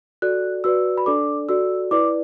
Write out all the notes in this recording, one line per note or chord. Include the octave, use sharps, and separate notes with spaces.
F#4 A4 D5 F#6
F#4 B4 D5 E6
B5
D4 A4 D5 D6
F#4 A4 D5 E6
E4 B4 D5 D6